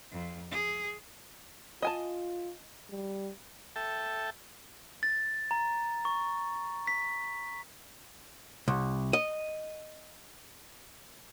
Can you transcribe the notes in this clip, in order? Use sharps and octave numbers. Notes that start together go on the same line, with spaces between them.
F2
G#4
F4 D#5 G#5 A5
G3
A4 E5 G5 A5
A6
A#5
C#6
B6
C2
D#5